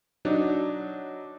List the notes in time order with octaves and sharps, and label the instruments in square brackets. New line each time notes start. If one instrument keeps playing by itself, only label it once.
[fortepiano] F#3 D4 D#4